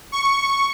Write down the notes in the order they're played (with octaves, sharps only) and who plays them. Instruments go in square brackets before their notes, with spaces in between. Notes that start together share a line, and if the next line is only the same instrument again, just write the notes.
[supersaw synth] C#6